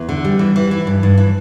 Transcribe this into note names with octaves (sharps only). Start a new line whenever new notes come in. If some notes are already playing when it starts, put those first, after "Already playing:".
Already playing: E2
D3
G3
E3
E3
E3
G2
G2
E3